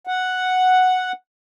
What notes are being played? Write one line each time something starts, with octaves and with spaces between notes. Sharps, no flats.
F#5